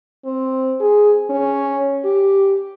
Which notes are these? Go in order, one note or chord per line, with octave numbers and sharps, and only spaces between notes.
C4
G#4
C#4
G4